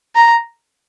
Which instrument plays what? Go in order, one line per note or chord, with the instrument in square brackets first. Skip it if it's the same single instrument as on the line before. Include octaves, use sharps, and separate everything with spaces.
[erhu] A#5